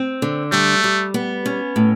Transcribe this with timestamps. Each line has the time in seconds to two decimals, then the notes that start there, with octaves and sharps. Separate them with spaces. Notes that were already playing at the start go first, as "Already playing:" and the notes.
Already playing: C4
0.22 D3
0.52 G3 A3
0.84 G3
1.14 B3
1.46 C#4
1.76 A2